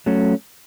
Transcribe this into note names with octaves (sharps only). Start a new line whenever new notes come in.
F#3 A3 C#4